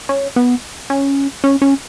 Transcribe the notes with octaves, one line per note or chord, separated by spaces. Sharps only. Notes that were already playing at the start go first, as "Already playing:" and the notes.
C#4
B3
C#4
C#4
C#4